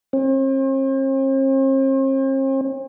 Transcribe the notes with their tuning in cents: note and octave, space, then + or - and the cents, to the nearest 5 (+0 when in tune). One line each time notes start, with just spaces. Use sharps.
C4 +45